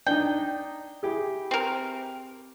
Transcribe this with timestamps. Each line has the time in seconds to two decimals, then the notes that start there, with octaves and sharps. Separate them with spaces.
0.06 D4 D#4 G5
1.03 E4 G4 G#4
1.51 C4 A#4